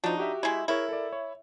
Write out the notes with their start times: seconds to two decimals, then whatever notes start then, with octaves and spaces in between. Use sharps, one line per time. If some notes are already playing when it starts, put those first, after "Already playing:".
0.04 F3 D4 D#4 F#4
0.17 F#4 G4 E5
0.43 G#3 E4
0.68 E4 G#4 A#4 C#5
0.89 A4 A#4 D5
1.13 C#5